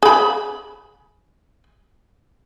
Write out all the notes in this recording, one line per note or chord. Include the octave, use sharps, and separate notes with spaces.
G#4 B5